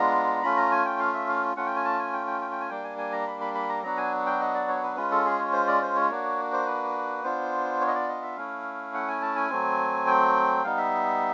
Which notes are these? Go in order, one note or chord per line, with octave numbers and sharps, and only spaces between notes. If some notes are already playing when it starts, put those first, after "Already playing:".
Already playing: G#3 B3 D4 F4 A#5
A3 C#4 F4 B5
A#5
G#5
G5
F5
E5
F5
A3 C#4 F4 F#5
G5
G#5
A5
G#5
G5
G5
G5
G5
G#5
G3 A#3 D4 G5
G#5
G#5
A#5
B5
B5
B5
A#5
F#3 B3 D4 F#4 A#5
G#5
G5
D#5
D5
C#5
B4
G#3 C#4 F4 B4
A4
G#4
C#5
C5
D5
C5
C#5
A#3 D4 F#4
C5
B4
B3 D4 F4 C5
C#5
D#5
D5
D#5
E5
A3 C#4 E4 F5
F#5
G#5
A5
G#5
F#3 A3 C4
G5
G3 B3 D#4 F5
E5